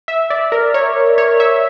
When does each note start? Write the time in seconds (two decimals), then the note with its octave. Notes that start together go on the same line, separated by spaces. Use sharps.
0.08 E5
0.30 D5
0.52 A#4
0.74 C#5
1.18 C#5
1.40 E5